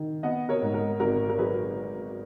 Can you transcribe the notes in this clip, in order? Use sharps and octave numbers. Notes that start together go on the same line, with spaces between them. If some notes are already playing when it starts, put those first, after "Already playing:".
Already playing: D#3
B3 D#5 F#5
A#4 C#5
G#2
A#4
G#1 A#4
A#4
F#3 G#4 B4